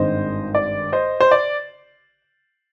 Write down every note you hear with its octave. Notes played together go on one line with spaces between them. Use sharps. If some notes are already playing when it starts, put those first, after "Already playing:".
Already playing: G#1 G2 D#3 G#3 C4 C5 D#5
D5
C5 D#5
C5
D5